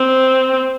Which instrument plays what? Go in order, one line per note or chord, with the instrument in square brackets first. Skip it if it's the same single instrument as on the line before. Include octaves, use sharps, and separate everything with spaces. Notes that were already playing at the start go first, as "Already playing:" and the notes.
Already playing: [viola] C4